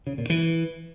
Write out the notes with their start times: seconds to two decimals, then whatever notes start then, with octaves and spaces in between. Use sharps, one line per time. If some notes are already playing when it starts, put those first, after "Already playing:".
0.07 C#3
0.18 A#2
0.30 E3